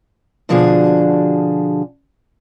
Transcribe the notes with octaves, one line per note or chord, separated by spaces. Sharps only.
B2 D3 F3 D4 F#4 G#4